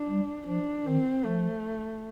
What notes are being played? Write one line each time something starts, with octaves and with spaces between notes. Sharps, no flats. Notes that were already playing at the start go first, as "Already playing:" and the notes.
Already playing: D4
G3
F3 D4
D#3 C4
F3 A3